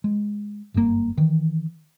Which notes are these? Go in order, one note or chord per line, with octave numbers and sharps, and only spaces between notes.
G#3
F#1 G2 B2 A#3
D#3 E3